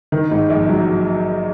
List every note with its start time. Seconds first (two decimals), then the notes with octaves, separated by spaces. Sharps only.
0.12 D#3
0.31 G#2
0.50 A#1
0.69 F#3